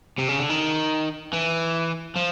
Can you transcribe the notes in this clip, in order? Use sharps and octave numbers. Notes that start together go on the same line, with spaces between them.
C3
C#3
D3
D#3
E3
F3